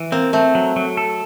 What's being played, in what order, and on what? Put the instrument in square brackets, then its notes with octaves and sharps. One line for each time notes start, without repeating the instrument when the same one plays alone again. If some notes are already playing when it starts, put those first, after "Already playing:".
Already playing: [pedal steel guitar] E3
[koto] A#3 [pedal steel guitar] C4
[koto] A3 [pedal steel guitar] C4
[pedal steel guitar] F#3
F#3
A4